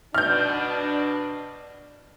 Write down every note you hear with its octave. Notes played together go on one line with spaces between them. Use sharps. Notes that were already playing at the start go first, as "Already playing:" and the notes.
B2 D4 F6 G6